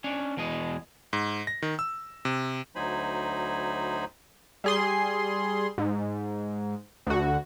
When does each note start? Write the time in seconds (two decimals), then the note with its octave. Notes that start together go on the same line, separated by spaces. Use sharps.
0.04 C#4 D4
0.37 E2 B2 G#3 D#5
1.13 G#2
1.47 A#6
1.62 D#3
1.79 E6
2.25 C3
2.76 D2 F#3 D#4 C5 G#5 B5
4.64 G3 G#4 C6
5.78 G#2
7.07 D2 F#4